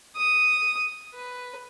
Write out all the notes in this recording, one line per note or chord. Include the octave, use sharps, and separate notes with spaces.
D#6
B4